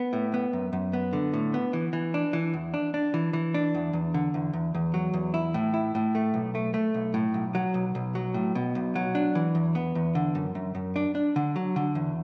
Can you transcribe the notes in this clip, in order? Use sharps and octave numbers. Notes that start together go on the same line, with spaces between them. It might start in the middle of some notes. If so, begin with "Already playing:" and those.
Already playing: B3
A2
B3
F#2
F#2
B3
D3
A2
B3
E3
E3
D4
E3
E2
D4
D4
E3
E3
D4
E2
E2
D3
E2
E2
E2
F#3
E2
E4
A2
E4
A2
A3
B1
A3
A3
B1
A2
B1
F#3
B1
B1
F#3
A2
B2
B1
F#3
D4
E3
E2
B3
E2
D3
F#2
F#2
F#2
D4
D4
D3
F#3
D3
E2